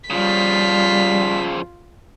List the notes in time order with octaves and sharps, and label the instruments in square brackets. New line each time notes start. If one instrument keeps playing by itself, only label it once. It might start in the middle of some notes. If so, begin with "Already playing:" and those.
[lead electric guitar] C#3 F3 [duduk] G3 [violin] F4 B6